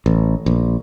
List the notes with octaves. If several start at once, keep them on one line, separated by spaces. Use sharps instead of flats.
A1
A#1